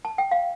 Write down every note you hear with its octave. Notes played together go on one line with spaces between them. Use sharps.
A5
G5
F5